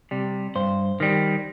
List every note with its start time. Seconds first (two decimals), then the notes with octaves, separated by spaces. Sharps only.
0.11 C3 G3
0.55 G2 C5
1.00 D#3 G3